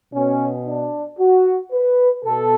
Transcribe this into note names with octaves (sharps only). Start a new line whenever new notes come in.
B2 C#4
D4
F#4
B4
B2 A4